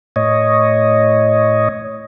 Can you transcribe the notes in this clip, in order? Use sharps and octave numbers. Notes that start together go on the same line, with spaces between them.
A2 C#5 D#5